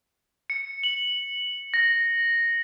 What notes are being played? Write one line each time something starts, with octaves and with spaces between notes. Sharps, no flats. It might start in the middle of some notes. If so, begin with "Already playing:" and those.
C#7
F#7
A#6